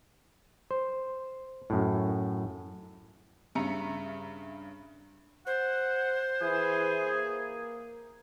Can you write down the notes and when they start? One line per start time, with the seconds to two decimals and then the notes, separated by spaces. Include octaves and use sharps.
0.71 C5
1.70 F#2 A2
3.55 G2 C#3 E5 A#5 C#7
5.47 C5 F#5
6.42 E3 G#4
7.03 A#3